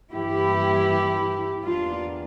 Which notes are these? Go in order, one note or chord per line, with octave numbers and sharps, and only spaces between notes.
G2 E3 A#3 E4 G4
E2 E3 A#3 D4 F4